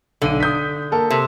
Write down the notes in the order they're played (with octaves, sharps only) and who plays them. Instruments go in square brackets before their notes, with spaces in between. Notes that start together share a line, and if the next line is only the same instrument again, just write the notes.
[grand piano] B1 D#7 [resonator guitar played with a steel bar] D3
[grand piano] D#6 G6 B6
A#3 A4 A#4
[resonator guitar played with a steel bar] C3